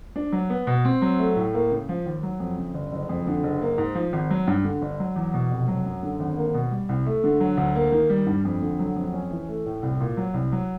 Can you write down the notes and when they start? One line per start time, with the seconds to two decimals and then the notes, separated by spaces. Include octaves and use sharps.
0.16 D4
0.32 F#3
0.50 B3
0.67 B2
0.85 C4
1.02 F#3
1.19 A3
1.37 A2
1.54 A#3
1.71 C#3
1.89 F3
2.06 D#2
2.23 F#3
2.40 F2
2.58 C#3
2.74 G1
2.92 F#1
3.09 F2
3.27 D3
3.43 F#1
3.62 A#3
3.78 G#2
3.95 F3
4.13 G#1
4.31 F#3
4.48 G2
4.65 D3
4.82 G1
5.00 F#3
5.16 E2
5.34 B2
5.51 F1
5.68 F#3
5.86 F#2
6.03 D3
6.20 G#1
6.37 A#3
6.54 B2
6.71 G3
6.89 C2
7.06 A3
7.24 D3
7.40 F#3
7.58 D2
7.75 A#3
7.92 D#3
8.10 G3
8.27 G2
8.45 F2
8.62 D3
8.79 F#3
8.96 F2
9.13 C#4
9.31 E3
9.48 A3
9.66 A2
9.83 C2
10.01 A#2
10.17 F#3
10.34 C2
10.52 F#3